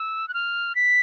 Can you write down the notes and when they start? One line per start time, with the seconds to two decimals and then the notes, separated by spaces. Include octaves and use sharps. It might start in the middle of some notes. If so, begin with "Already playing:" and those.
Already playing: E6
0.28 F#6
0.34 F6
0.75 B6